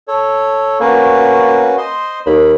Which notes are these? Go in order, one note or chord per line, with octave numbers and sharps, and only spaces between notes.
A4 C#5
A#3 C#4 F#4 B4
C5 D#5 C6
D#2 B5